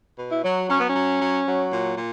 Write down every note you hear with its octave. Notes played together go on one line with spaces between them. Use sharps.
B2
E4
F#3
F#3 C#4
B3
F#3 C#4
F#3
F#3
A#2
A#2